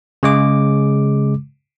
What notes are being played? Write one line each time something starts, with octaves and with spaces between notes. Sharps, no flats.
C#3 G#3 D6